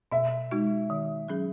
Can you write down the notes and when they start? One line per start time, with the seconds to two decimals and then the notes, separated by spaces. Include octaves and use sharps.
0.12 B2 E5
0.51 G#3 D#4 F#4
0.90 D#3
1.28 F#3 C#4 G#4